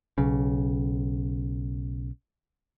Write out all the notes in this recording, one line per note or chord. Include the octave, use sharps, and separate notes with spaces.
B1 C#3